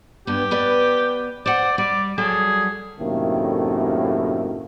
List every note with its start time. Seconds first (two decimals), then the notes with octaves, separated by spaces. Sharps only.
0.27 G2 B3 G4
0.51 B3 B4 D5
1.46 C5 D5 F#5
1.78 G3 D5
2.18 F#3 G3 G#4 A4
3.00 F#2 A2 C3 D#3 A3 A#3